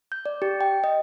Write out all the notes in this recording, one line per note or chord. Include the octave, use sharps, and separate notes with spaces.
G6
D5
G4
G5
D#5